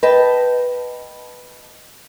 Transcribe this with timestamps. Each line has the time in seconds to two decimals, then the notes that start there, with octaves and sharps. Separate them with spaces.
0.03 B4 D#5 G5 A5